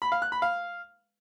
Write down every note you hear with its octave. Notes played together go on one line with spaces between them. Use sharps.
B5
F5
F#6
B5
F5